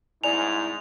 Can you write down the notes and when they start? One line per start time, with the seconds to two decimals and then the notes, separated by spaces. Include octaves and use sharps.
0.24 C2 G#2 E4 D5 G#5 F7